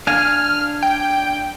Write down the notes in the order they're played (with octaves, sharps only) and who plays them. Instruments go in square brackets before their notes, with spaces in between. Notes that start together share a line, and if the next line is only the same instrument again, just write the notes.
[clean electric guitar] D4 F5 G#5 [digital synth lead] F6
[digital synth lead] G5